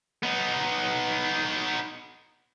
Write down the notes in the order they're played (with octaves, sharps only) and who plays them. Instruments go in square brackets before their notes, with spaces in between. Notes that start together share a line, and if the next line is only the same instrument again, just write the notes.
[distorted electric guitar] B3 D#4